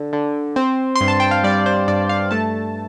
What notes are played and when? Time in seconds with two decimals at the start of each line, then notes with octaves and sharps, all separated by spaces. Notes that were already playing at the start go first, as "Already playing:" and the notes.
Already playing: D3 D4
0.13 D3
0.56 C4 C5
0.96 C6
1.01 G2
1.08 A5
1.20 G5
1.31 F5
1.44 G3 D5
1.66 C5
1.88 G2 D5
2.09 F5
2.31 A3 A5